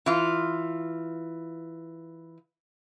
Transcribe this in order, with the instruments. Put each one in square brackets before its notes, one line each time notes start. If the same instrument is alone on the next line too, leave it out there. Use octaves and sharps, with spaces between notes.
[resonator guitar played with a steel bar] E3 F4